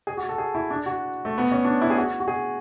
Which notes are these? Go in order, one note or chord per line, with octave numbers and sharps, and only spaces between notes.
G#4
F#4
A4
G#4
E4
D4
F#4
A3
B3
C#4
D4
E4
G#4
F#4
F#4
G#4